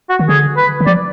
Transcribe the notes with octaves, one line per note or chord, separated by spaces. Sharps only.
F#4
D#3
D3 G#4
B4
D#3
F3 D5